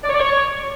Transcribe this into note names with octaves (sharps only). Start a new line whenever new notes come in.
D5
C#5
D5
C#5